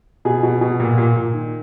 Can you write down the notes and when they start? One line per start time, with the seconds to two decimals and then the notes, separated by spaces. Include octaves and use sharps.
0.25 B2 G#4
0.43 B2
0.61 B2
0.80 A#2
0.98 A#2
1.16 A#2
1.34 D#3